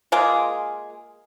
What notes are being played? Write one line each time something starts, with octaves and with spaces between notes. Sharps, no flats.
G#3 A#3 F4 G#4